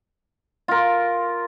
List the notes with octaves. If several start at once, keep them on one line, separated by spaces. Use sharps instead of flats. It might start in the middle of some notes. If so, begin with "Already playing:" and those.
F4 A#4